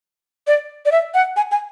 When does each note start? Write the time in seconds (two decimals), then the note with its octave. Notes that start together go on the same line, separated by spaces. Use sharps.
0.47 D5
0.86 D5
0.92 E5
1.14 F#5
1.36 G#5
1.51 G#5